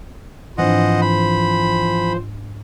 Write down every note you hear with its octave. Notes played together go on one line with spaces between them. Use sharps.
G#2 E3 F3 C4 D4 C5 D#5 F#5
B5